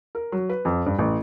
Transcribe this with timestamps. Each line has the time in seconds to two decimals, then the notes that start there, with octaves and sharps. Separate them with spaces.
0.15 A#4
0.32 F#3
0.49 B4
0.65 F2
0.86 G2
0.99 A1